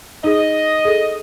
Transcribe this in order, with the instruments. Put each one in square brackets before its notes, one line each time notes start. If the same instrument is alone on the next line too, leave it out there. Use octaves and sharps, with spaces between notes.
[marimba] D#4 G#4 [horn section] D#5
[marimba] G#4 A4